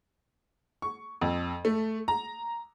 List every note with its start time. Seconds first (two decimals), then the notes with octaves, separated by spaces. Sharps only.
0.82 C#6
1.21 F2
1.65 A3
2.08 A#5